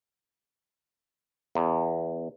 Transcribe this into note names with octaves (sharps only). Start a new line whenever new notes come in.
E2